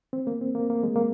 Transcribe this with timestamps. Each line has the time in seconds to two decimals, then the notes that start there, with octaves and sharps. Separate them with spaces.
0.13 C4
0.27 A#3
0.41 C4
0.55 A#3
0.70 A#3
0.83 G#3
0.96 A#3